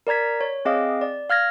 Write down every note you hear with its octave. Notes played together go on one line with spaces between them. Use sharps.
A#4 D5 A#5 G#6 B6
C#5
C4 G#4 D#5 F5 D6
D5
F5 F6 G#6 A#6